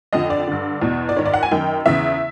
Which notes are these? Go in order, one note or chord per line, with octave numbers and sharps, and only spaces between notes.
F2 D3 D#5
D5
G2 D3
E2 B2
D5
G#2 D#3 C#5
D5
F#5
G#5
F#2 D#3 G5
E2 C#3 E3 E5